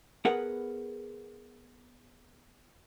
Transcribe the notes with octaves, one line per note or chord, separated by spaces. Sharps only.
B3 G#4 A#4 B4 F#5